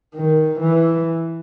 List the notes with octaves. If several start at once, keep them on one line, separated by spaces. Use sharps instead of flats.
D#3
E3